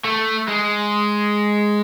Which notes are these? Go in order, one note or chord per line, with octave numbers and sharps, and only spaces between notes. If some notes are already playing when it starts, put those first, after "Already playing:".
A3
G#3